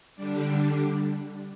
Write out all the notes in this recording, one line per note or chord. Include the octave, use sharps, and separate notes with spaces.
D3 G3 D4